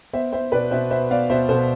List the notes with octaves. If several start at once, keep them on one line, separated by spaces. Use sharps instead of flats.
B3 C5 E5
B3 C5 E5
B2 B4 D5
B2 C5 E5
B3 C5 E5
B3 D5 F5
B2 C5 E5
B2 A4 C5